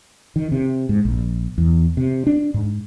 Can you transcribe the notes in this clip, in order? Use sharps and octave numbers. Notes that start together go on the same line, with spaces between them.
D#3
C3
G#2
A#1
E2
C3
D4
G#2